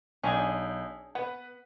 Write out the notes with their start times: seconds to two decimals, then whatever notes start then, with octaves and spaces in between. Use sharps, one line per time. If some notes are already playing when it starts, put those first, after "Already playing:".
0.23 B1 C#4 D4 G#4 G5
1.15 B3 B4 F#5